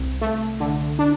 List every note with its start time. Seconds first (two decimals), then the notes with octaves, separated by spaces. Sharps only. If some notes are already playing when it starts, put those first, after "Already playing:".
Already playing: C2
0.21 A3
0.60 D3
0.99 D4